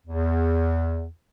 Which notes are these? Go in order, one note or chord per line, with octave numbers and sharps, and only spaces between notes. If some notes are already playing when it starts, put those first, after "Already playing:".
E2